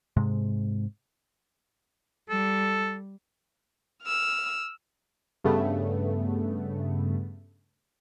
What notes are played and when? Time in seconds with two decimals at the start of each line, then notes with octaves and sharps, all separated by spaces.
0.17 G#2 C3 G#3
2.30 G3 A4
4.04 E6 F6
5.44 G2 C#3 A3 B3